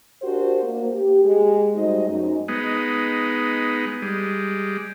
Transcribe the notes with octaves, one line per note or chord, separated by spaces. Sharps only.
D4 F#4 G4 A#4 C5
A#3
G4
G#3 G4 G#4
G3 A3 D#4 F#4 C5 D#5
F#2 D#4
G#3 B3 D#4
G3 G#3